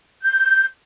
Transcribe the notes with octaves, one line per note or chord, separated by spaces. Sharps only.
G6